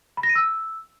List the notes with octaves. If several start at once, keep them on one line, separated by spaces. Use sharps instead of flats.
B5
A#6
D#7
E6